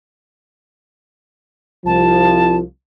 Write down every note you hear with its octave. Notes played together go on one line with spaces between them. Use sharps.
C2 F3 A5